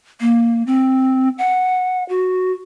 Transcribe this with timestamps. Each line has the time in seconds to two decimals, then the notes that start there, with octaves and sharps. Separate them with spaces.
0.21 A#3
0.67 C4
1.38 F#5
2.09 F#4